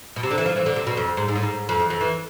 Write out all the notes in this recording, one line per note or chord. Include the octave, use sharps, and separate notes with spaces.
B2
C3
D3
E3
F3
E3
D3
C3
B2
F2
G#2
G#2
A2
G#2
F2
E2
F2
E3